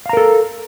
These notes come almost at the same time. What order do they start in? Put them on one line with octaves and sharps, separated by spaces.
F5 A#5 A#4 A4